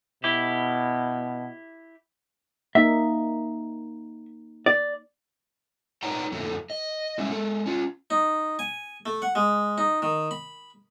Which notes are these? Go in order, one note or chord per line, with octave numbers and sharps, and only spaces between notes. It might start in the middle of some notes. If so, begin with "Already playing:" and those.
B2 E4 G4
A#3 D#4 E5
D5
D#4 B4 C#5 D5 G5 A#5
F2 D3 F#3 A3
D#5
G3 G#3 C#4 E5
G#3 A4
C#4 F4
D#4
G#5
A3
F#5
G#3
D#4
D#3
B5